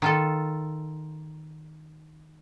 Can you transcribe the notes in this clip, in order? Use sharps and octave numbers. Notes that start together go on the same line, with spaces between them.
D#3 F4 A4